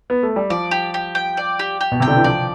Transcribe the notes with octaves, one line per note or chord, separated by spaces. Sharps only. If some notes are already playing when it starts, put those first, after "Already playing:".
B3
A3
G3
F3 D5
G4
G4
G5
D5
G4
G4
B2
C3 G5
D3
E3
F3 D5